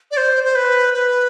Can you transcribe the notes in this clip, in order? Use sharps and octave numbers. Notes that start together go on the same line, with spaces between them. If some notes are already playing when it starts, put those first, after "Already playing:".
D5
C5
C5
B4
B4